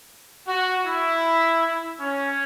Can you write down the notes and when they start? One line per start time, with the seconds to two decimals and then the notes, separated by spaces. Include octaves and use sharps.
0.47 F#4
0.84 E4
1.98 C#4